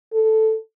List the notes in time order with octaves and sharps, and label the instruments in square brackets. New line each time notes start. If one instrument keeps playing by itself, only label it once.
[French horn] A4